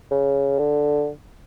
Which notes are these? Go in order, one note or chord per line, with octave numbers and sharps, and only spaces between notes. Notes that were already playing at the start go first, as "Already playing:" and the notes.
C#3
D3